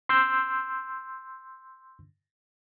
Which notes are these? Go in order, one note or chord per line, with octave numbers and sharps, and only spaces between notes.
C6 E6 G6